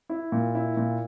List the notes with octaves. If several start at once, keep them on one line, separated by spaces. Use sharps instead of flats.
E4
A#2
E4
A#2